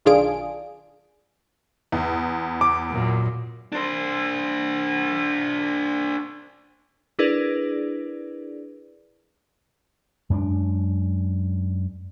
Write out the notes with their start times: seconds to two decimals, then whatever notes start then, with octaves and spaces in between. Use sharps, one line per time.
0.05 B1 D#3 D4 F4 G#4 D7
1.92 E2
2.61 D6
2.91 F#2 A#2 A#3
3.72 D4 C5
7.19 D4 E4 G#4 A#4 B4 D5
10.30 F#2 G#3 C4 D4